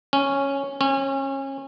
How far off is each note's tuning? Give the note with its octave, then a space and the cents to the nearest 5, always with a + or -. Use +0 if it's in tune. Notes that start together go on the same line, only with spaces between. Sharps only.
C#4 -5
C#4 -30